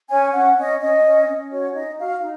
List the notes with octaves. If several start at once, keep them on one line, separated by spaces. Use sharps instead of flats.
C#4 G#5
C#4 F#5
C#4 D#5
C#4 D#5
C#4
C#4
F#4 C#5
D#4 D#5
F#4 F5
D#4